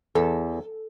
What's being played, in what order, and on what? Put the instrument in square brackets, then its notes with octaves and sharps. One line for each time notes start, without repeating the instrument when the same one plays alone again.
[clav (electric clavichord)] E2 [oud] A4